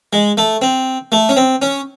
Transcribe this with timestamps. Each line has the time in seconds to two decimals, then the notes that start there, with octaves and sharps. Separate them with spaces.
0.13 G#3
0.37 A3
0.62 C4
1.12 A3
1.29 C#4
1.36 C4
1.62 C#4